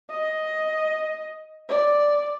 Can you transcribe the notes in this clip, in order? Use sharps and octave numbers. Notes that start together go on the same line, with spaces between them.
D#5
D5